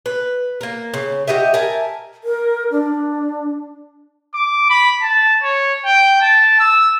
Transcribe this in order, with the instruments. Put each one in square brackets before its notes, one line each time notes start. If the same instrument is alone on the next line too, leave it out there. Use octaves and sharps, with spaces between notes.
[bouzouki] B4
A#3 A#4
C#3
F#4 G4 D#5 E5
A#4 E5 G#5 A5
[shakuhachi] A#4
D4
[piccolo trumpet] D6
B5
A5
C#5
G5
A5
E6